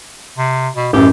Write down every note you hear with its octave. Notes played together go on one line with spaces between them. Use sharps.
C3
B2
A1 F#2 G4